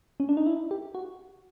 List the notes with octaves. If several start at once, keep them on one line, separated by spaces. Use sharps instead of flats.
C#4
D4
D#4
E4
G4
F#4